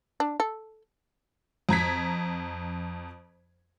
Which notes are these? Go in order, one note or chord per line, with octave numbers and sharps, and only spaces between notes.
D4
A4
F2 A#5 G#6 B6